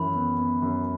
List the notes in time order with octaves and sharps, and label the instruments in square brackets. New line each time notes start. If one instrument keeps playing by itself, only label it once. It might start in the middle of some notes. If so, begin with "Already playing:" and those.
Already playing: [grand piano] F#2 E3 [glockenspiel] B5
[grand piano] B3
B3
F#2